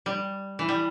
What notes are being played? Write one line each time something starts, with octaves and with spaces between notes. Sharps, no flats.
G3
E3
G3